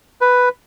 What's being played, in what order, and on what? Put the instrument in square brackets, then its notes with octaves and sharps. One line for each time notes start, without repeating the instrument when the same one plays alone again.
[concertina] B4